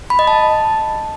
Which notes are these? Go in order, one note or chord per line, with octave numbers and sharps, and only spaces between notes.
B5
D#5
A5